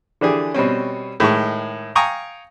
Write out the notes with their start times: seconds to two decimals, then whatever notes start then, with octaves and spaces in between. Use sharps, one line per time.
0.21 D3 E3 D4 G4 G#4
0.54 B2 G3 C4 C#4
1.20 A2 D#3 G#3 C#6
1.95 F5 G5 G#5 A#5 C#6 D#6